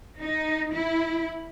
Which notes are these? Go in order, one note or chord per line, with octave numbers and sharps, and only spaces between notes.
D#4
E4